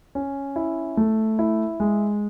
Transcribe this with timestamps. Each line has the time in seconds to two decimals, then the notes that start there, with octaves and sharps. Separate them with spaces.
0.15 C#4
0.56 E4
0.97 A3
1.39 E4
1.80 G#3